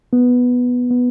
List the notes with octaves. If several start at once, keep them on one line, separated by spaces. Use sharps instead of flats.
B3
B3